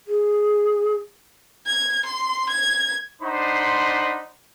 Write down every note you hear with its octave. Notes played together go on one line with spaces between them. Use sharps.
G#4
G#6
C6
G#6
D4 D#4 C5 F#5 B5 C6